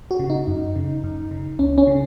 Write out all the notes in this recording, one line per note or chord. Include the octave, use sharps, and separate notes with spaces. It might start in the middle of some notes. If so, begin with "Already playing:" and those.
F#4
C#3
D#4
F#2
C#3
F#2
C#3
C#2 C#4
C#4
C#3